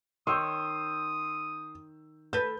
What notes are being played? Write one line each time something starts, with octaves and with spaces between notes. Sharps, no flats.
D#3 C#5 C6 D#6 E6 G6
A4 B4 G6